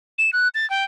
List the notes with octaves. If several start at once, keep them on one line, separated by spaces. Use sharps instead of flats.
E7
F#6
A6
G5